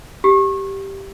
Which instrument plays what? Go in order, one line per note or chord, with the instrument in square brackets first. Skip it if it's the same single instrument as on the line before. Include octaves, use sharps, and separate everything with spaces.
[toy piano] G4